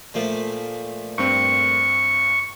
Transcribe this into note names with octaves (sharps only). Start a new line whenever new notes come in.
A#2 F3 A3
G2 C4 C#6